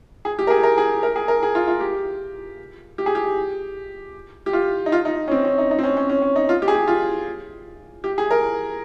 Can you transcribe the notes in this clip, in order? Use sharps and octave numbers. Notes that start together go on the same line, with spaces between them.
G#4
G4
A#4
G#4
A#4
G#4
A#4
G#4
A#4
G#4
F4
F4
G4
G4
G#4
G4
G4
F4
D#4
F4
D#4
C#4
C4
C#4
D#4
D#4
C4
C#4
C#4
C#4
C#4
D#4
F4
G4
G#4
G4
F4
G4
G#4
A#4